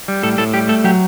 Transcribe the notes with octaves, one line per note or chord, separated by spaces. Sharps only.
G3
A2 A4
A2 A4
G3 G4
A3 A4
F#3 G4